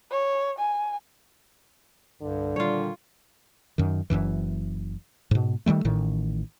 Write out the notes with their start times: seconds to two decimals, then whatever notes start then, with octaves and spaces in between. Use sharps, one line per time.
0.11 C#5
0.59 G#5
2.21 C2 G2 D3
2.56 A#2 D#3 G3 F4 C#5
3.78 F#2 D#3
4.10 F#1 C#2 F#2 E3
5.31 G#2 B2
5.66 D#3 F3 G3 A3
5.85 A1 A2 D#3